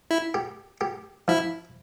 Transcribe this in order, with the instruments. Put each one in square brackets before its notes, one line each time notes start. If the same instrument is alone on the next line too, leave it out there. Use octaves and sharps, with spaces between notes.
[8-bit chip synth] E4
[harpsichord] G4
G4
[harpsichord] F3 [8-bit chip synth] E4